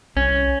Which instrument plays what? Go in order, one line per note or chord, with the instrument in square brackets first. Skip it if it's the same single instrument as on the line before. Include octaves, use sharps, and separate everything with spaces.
[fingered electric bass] C2 [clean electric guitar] C#4